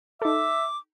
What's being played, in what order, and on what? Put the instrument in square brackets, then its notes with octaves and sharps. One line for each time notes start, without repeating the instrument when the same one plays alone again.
[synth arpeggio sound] D#4 A4 [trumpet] E5 [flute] D6